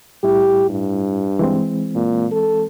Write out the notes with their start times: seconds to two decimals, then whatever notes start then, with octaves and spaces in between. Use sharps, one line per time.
0.23 A2 G3 E4 G4
0.69 G2
1.39 E3 G#3 C4
1.95 A#2
2.32 A4